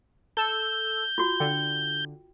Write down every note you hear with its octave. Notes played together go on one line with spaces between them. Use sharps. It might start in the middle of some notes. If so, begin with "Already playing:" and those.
A4 E6 G6
F4 F#4
D3 G5